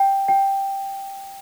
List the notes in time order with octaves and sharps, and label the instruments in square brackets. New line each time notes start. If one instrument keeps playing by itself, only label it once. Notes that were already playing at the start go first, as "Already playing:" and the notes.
Already playing: [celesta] G5
G5